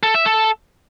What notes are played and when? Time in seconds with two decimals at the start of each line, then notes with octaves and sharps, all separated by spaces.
0.03 A4
0.14 E5
0.26 A4